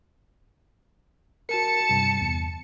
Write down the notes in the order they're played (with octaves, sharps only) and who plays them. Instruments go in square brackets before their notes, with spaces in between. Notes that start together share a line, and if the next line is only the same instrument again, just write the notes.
[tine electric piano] F#4 A#4 [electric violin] A5 C#7
[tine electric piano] G2 C3 G3
E2